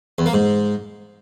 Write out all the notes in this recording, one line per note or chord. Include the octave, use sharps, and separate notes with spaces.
E2
A#3
G#2